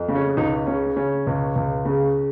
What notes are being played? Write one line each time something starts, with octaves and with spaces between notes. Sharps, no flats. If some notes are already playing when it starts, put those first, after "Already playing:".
Already playing: F2
C#3
C#4
C#2 D#4
C#3 C#4
C#3 C#4
C#2
C#2
C#3